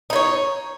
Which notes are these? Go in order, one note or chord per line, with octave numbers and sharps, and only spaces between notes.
D#4 E4 C#5